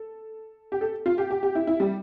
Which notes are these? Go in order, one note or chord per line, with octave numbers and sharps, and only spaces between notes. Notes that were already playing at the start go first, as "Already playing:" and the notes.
Already playing: A4
G4
A4
F4
G4
G4
G4
E4
E4
G3